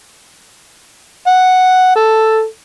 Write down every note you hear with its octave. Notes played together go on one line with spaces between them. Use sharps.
F#5
A4